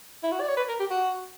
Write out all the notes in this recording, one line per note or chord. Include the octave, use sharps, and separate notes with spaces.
E4
F#4
D5
C#5
B4
A#4
G4
F#4